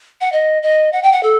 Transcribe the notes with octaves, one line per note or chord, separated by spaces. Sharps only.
F#5
D#5
D#5
F#5
G5
F#5
A4